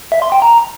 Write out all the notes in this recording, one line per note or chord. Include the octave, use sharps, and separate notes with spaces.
E5
C6
G5
A#5